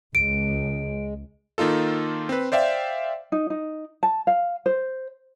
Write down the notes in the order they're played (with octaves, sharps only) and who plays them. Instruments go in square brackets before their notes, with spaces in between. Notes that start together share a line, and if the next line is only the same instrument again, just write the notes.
[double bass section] C#2 [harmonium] G#3 [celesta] D7
[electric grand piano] D#3 A#3 D#4 F4 A4
C4 B4
C5 D5 E5 F5 G5
[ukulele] D#4
D#4
A5
F5
C5